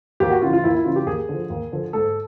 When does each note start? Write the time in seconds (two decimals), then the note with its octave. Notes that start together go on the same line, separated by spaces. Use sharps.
0.20 D#2 G4
0.30 F#4
0.42 C#3 F4
0.46 E3
0.53 F4
0.64 D#2 E4
0.75 E4
0.85 C#3 E3 F4
0.96 G4
1.06 D#2 G#4
1.29 D3 F3
1.50 D#2
1.72 D3 F3
1.93 G#2 A4